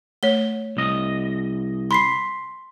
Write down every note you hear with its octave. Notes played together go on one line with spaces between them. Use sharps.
A3 C#5 G7
C2 D#5
B5 C6 B6 C7